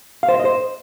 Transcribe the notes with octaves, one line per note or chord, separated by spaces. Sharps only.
F5
C5
E5
D#5
C5